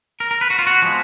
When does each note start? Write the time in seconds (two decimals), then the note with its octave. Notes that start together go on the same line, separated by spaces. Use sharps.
0.20 A#4
0.31 A#4
0.41 B4
0.50 F#4
0.59 F4
0.67 F#4
0.82 F3 G#3 B3